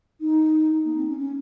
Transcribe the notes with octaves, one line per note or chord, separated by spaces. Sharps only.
D#4
A#3
C4
C#4
C#4